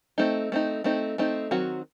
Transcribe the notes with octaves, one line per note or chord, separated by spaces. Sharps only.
A3 C4 D#4
A3 C4 D#4
A3 C4 D#4
A3 C4 D#4
D#3 F#3 C4 F#4